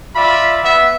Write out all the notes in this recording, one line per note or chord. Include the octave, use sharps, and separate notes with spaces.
F4 D5 E5 B5
B3 E5